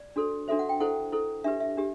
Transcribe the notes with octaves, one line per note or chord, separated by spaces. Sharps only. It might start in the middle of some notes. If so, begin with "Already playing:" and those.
Already playing: D5
D4 F#4 A4 C5
D4 F#4 A4 C5 E5
F#5
G5
E4 A4 C5 F#5
E4 A4 C5
D4 G4 B4 E5
E5
D4 G4